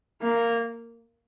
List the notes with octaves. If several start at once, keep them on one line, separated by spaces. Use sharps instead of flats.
A#3